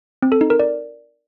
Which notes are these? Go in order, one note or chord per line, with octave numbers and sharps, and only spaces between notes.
C4
A4
D#4
A#4
D5